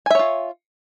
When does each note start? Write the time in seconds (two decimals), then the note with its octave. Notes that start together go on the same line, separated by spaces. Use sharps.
0.06 G#5
0.11 E5
0.15 C#5
0.19 F4